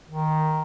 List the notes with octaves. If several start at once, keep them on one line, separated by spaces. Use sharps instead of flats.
D#3